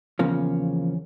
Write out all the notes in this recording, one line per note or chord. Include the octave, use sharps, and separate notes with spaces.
E2 C#3 F3 A#3 C#4